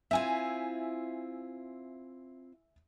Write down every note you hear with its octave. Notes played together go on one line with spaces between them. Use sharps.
C4 E4 F4 E5 G#5